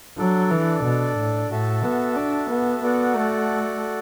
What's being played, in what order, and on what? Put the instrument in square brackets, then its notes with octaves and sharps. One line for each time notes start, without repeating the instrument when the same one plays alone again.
[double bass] F#3 [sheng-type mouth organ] D4 A4 D5
[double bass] E3
B2
A2
[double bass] A2 [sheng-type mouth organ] F#4 A4 E5 A5
[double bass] B3
D4
B3
[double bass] B3 [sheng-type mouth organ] F#4 A4 D5 F#5
[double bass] A3